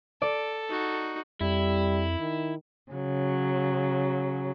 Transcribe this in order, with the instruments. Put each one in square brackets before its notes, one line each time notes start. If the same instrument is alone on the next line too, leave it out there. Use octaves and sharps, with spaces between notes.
[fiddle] A4 [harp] D5
[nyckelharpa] D#4 F#4
[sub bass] F2 [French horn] G3 [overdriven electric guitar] E4
[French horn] D#3
[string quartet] C#3 F#3